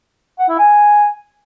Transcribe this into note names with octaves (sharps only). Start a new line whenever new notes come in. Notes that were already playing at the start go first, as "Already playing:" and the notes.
F#5
E4
G#5